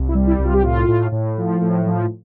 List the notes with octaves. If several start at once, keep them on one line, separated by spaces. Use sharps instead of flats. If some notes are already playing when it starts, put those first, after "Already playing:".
Already playing: C2
E4
G3
E4
C2
F4
G4
A2 F4
A2
A2
F3
A2
F3